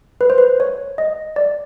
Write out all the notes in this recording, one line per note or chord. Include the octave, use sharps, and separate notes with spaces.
B4
C5
B4
C#5
D#5
D5